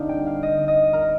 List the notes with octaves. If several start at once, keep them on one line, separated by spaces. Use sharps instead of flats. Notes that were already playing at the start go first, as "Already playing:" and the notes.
Already playing: D3 G3 C4 D#4 D5 F5
G5
F5
D#5
D#5
A#4